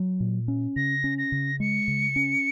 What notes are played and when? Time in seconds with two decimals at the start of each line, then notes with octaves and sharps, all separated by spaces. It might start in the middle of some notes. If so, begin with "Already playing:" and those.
Already playing: F#3
0.20 A#2
0.48 C#4
0.76 C#3 A#6
1.04 C#4
1.18 A#6
1.32 C#3
1.60 G#3 C#7
1.88 C#3
2.16 C#4